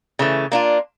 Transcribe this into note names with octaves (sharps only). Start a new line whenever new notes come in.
C#3 E3 A3
A#3 D4 F4